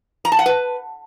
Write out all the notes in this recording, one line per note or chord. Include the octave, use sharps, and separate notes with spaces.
A#5
A5
F#5
B4